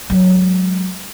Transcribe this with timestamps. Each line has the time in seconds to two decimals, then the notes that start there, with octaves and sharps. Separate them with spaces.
0.10 F#3 G#3